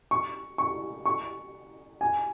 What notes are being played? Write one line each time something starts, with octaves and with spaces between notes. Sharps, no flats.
C#6
C#6
C#6
G#5